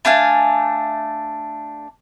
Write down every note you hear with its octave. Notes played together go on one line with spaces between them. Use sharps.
A3 D4 F5 G#5